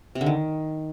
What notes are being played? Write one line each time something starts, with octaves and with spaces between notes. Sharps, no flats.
C3
D3
D#3